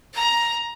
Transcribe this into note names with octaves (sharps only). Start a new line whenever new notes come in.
A#5